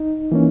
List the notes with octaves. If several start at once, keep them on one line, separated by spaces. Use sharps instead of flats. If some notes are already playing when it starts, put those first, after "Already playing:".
Already playing: D#4
E3 A#3 C#4